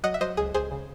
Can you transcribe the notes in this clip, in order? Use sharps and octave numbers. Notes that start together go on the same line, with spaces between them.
F#3 D#5 F#5
E5
F#3 C5 D#5
C#2 G#4
C#2 G#4 C5
C#3